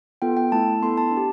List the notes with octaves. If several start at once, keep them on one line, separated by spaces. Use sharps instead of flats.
B3 F4 A4 G5
G5
A3 E4 A4 A5
B3 E4 A4 C6
A5
D4
G4